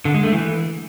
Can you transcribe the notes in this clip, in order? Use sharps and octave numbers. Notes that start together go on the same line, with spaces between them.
D3
G#3
A3
E3